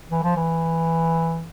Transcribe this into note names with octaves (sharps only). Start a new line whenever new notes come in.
E3
F3
E3